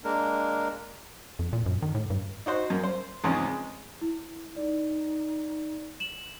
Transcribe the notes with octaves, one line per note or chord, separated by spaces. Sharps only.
G#3 A#3 D4 A#4
F2
A#2
F#2
D#3
A2
G2
D#4 F#4 C5
F#2 A#3
C5
E2 G#2 C#3 F3 C4 C#4
G#3
E4
D#4 D5
E7 F#7